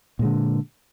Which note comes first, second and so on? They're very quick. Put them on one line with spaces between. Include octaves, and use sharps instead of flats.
A#2 G#3 D3